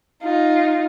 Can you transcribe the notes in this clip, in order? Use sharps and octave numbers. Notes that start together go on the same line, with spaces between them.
D#4 F4